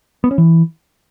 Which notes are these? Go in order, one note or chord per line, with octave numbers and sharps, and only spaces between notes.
B3
C#4
E3